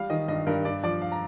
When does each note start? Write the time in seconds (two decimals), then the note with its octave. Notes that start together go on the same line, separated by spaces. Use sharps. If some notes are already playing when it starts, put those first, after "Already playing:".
Already playing: G3 F5
0.10 D#3 D#5
0.28 G2 D#5
0.47 G2 A#4
0.65 G2 D5
0.83 F3 D5
1.02 F5
1.12 A#5